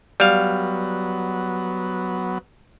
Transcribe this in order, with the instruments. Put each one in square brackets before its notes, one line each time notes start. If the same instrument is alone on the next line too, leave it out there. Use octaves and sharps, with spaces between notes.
[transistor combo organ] F#3 B3 [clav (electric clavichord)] G3 F5